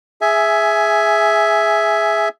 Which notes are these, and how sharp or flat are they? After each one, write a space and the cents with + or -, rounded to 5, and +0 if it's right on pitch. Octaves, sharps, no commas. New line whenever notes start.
G#4 +0 E5 +0 G#5 +15